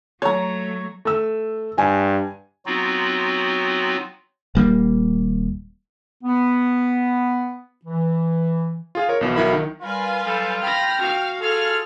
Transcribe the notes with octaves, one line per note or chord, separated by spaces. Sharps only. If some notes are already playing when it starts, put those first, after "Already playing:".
F#3 A3 C#5 A#5
A3 E6
G2 G#5
F#3 B3 C4 D#4 F4 F#4
D#1 G3 A#3
B3
E3
F4 G#4 F5
A#4 C#5
B1 B2 E3
B1 F#3 E4 A#4 B5
D#3
G3 F4 A#4 B4 G#5
F#3 G3 A4
G5 B5 F6 A#6
F#4 F5
F4 G#4 A4 F6